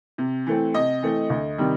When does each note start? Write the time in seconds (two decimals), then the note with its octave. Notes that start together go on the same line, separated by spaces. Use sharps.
0.18 C3
0.47 E3 A3 C4
0.74 C3 D#5
1.03 E3 A3 C4
1.30 D2
1.58 C3 D#3 G3